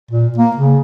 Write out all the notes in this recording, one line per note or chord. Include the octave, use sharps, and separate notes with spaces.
A#2
A#3
C#3